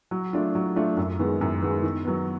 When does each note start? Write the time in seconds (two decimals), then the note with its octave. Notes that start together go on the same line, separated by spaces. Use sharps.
0.11 F#3
0.33 A3 D4 F4
0.55 F#3
0.76 A3 D4 F4
0.97 F#2
1.19 D#3 G#3 B3
1.41 F#2
1.63 D#3 G#3 B3
1.83 D#3
2.05 F#3 B3